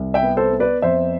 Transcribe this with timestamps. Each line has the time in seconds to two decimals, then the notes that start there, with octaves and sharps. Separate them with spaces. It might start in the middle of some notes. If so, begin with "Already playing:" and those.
Already playing: C2
0.14 E5 G5
0.23 B3
0.37 A4 C5
0.52 B3
0.60 B4 D5
0.82 F2 C5 E5